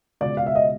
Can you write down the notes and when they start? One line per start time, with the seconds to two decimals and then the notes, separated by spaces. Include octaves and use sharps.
0.21 C#2 B2 D5
0.37 F5
0.46 E5
0.55 D#5